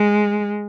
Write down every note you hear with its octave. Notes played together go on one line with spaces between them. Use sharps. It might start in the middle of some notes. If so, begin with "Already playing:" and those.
Already playing: G#3